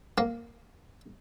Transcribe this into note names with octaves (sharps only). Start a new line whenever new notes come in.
A#3